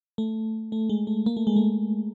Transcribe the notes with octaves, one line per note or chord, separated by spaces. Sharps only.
A3
A3
G#3
A3
A#3
A3
G#3
A3